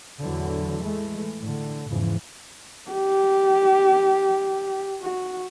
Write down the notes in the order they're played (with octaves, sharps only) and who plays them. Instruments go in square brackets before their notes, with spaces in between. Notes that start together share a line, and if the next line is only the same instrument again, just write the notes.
[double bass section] E2 A2 D3 E3 F#3
E3 G#3 A3
A2 D3
E2 G#2 C#3 E3 F3
[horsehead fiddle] G4
F#4